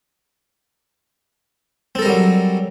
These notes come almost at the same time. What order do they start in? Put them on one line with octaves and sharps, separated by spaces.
C4 A4 A#4 G3 F#3